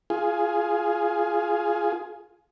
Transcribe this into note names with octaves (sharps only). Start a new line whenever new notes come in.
F4 G#4